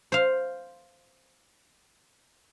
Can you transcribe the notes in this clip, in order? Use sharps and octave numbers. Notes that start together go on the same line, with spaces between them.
C5 F5